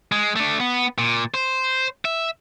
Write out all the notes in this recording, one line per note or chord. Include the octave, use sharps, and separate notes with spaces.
G#3
A3 D4
B3
A#2
C5
E5